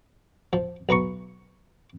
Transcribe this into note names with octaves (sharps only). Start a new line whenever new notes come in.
F3
B1 B4 A#5 C#6